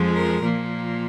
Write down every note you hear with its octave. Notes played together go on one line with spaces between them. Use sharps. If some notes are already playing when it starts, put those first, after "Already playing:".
Already playing: F2 F3 G#3
A#4
A#2 F3 A#3